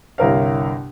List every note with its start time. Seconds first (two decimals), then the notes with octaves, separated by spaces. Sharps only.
0.18 G1 C2 E4 A#4 C#5 F5